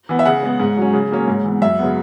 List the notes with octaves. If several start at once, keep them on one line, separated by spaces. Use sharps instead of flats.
E3 B3
E5
C#3 F#5
G#3 B3
G#2
F#3 C#4
C#3
F#3 A#3 C#4
G#2
E3 B3
F#2 E5
C#3 F#3 B3